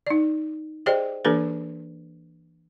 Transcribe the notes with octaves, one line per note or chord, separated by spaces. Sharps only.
D#4 D5
G4 G#4 C5 D5 D#5 G5
E3 A#3 D4 G4 A4 B4